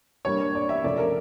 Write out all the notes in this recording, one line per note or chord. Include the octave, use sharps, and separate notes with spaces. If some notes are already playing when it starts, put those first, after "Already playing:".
D3 G3 A#3 D4 C#5
D5
E5
C#3 F3 A3 D5
A#4